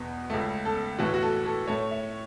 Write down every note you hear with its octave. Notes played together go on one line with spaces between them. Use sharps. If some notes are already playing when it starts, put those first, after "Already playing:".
Already playing: E2 B2 B3
C#2 C#3 A3
A4
A2 E3 A3 F#4
F#4
A4
A4
A2 A3 C#5
E5